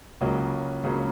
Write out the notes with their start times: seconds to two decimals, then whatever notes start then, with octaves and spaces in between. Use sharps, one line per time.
0.21 C#2 C#3 F#3 A#3 C#4
0.84 C#2 C#3 F#3 A#3 C#4